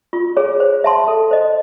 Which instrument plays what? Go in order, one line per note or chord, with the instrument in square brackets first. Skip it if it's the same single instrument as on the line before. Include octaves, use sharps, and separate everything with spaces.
[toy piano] F4
G#4 C#5
C5
E5 A5 C6
A4
C5 D#5